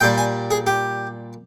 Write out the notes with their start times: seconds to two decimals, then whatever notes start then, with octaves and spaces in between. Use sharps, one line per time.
0.01 A#2 G3 G5
0.18 G#5
0.51 G#4
0.67 G4